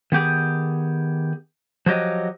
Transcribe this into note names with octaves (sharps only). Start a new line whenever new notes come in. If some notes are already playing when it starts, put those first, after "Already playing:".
D#3 B3 G4 G#4
F3 F#3 G4 D#5